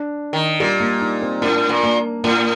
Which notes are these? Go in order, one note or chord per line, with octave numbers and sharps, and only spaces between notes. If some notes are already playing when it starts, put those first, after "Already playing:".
Already playing: D4
D#3
A#2 G3
A#3
D#4
C4
A2 D4
A#2
A#3
A2 A#3